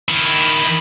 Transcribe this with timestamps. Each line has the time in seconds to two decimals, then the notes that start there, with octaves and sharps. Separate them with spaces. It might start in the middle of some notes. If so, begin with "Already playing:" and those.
0.09 D#3 E4